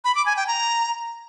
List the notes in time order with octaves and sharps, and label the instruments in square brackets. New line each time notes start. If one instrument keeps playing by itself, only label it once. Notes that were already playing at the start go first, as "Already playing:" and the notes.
[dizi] B5
D6
G#5
G5
A#5